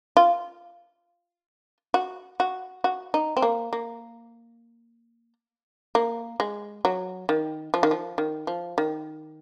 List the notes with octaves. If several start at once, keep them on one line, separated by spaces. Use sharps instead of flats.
F4
F#4
F#4
F#4
D#4
C4
A#3
A#3
A#3
G#3
F#3
D#3
F3
D#3
F3
D#3
F3
D#3